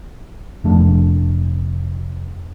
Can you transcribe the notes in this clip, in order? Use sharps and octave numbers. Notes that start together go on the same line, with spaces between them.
F1 A3 D4